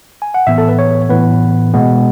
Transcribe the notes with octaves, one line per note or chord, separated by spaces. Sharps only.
G#5
F#5
A2 E3 B3 E5
A4
B4
C#5
A2 E3 B3 B4
B2 G#3 B3